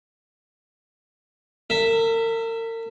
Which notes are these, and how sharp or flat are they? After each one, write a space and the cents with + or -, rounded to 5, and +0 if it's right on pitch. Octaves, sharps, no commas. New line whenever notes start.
A#4 -40 E5 +0